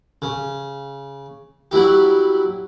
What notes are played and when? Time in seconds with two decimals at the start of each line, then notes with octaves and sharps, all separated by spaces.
0.22 C#3
1.71 F#3 G3 E4 G4